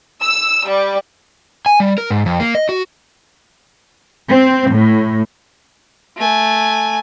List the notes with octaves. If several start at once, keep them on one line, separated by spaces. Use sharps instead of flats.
E6
G3
G#5
G3
A#4
G#2
F2
A#3
D#5
F#4
C4
A2
A3 G#5